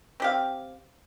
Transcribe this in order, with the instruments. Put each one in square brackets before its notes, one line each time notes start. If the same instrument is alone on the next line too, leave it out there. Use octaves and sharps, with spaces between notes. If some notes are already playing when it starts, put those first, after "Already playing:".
[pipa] C4 G4 F5